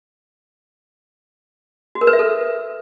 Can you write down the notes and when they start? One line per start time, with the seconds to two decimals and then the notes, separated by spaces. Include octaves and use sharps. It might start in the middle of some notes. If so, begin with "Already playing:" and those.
1.95 F#4
2.01 A#4
2.07 B4
2.13 E5
2.19 A4